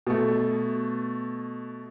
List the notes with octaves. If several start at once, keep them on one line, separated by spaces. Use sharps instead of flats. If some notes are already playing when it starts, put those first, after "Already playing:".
B2 A3